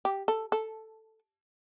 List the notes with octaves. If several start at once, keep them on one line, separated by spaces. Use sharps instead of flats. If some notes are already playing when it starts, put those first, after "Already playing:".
G4
A4
A4